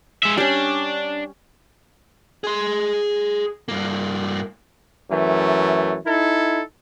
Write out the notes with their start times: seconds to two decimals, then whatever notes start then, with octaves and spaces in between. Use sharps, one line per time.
0.23 G#3 E5
0.37 G3 C#4 D4
2.44 G#4 C6
3.68 G2 A#3
5.10 F#2 E3 A3
6.05 D#4 E4 A4